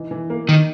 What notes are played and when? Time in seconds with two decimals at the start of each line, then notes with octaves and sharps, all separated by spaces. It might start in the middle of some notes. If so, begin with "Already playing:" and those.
Already playing: E3 D#4
0.11 E3
0.30 A#3
0.48 D#3 D#4